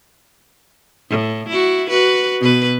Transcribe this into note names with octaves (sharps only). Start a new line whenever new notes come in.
A2
E4 F#4
F#4 B4
B2 B4